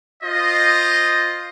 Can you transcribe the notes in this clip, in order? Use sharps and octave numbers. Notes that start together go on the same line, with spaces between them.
F4 C5 D#5